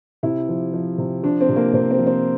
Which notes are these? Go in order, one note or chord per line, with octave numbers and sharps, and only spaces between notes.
C3 E4
F3
F3
C3
F3 D4
C4
C3
A#3
C3 C4
C4
F3
C4